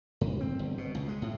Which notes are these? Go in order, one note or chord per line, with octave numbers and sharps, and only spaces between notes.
G2
C4
G1
B2
C#2
G#3
A2